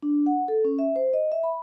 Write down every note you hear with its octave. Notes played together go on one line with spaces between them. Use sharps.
D4
F#5
A4
C#4
E5
C5
D#5
E5
B5